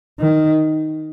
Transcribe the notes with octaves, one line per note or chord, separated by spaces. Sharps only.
D#3